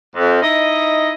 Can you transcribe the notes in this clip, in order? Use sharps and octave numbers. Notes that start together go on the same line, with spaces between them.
F2
D#4 E4 D#5